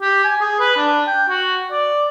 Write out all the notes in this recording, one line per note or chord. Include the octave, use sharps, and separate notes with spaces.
G4
G#5
G#4
B4
D4
G5
F#4
D5